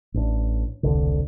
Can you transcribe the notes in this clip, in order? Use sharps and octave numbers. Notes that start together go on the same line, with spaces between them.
A1 D4
E1 C2 D3